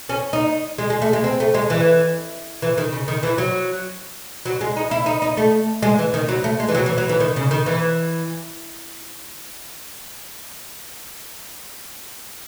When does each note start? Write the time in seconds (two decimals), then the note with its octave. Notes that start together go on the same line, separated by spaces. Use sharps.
0.09 C#4
0.33 D#4
0.78 G#3
0.90 G#3
1.02 A3
1.13 G#3
1.24 C4
1.40 A3
1.54 G#3
1.70 E3
2.62 E3
2.78 D#3
2.92 C#3
3.08 D#3
3.23 E3
3.38 F#3
4.46 F#3
4.61 G#3
4.77 D#4
4.91 E4
5.06 D#4
5.22 D#4
5.37 A3
5.82 G#3
5.98 E3
6.14 D#3
6.29 F#3
6.44 A3
6.60 G#3
6.68 E3
6.75 F#3
6.86 E3
6.98 F#3
7.09 E3
7.20 D#3
7.36 C#3
7.51 D#3
7.66 E3